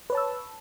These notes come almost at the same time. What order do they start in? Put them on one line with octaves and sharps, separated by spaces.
B4 C#5 A5 E6